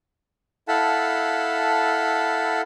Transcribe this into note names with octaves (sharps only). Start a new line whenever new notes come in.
E4 A4 F5 F#5 A5 B5